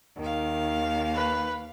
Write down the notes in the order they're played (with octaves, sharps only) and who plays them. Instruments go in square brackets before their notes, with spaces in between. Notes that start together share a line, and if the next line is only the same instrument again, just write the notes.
[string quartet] D#2 F5 [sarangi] D#3
[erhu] B4